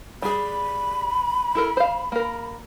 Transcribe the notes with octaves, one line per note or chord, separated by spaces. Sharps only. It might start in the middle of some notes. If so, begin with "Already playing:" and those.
G3 G#4 B5
E4 A4 A#4
C5 F5
A#3 A#4